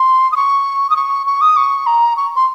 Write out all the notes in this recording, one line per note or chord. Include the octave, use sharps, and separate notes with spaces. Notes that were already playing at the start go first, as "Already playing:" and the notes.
Already playing: C6
D#6
C#6
D#6
C#6
C#6
D#6
C#6
A#5
C#6
C6